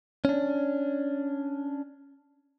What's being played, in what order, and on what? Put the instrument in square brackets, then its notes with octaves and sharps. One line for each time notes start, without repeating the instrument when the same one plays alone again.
[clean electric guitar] C#4 D4